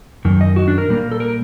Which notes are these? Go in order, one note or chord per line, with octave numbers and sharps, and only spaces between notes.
F#2 D#3
D#5
F#4
D4
A#4
A#2 G3 A#3
A4
A#4